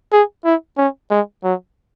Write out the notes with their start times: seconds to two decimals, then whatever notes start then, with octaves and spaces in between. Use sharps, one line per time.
0.13 G#4
0.45 E4
0.78 C#4
1.11 G#3
1.44 F#3